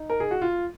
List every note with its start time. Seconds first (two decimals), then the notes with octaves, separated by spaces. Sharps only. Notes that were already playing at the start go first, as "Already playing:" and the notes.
Already playing: D#4
0.10 A#4
0.20 G#4
0.31 F#4
0.42 F4